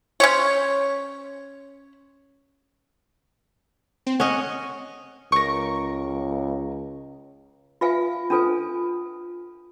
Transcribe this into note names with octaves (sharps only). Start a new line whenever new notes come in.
C#4 C5 C#5
C4
C#4 D#5 F#5
C#2 A#4 C#6
F4 B4 E5 F5 G#5
C#4 D4 F4 A4 B4 G#5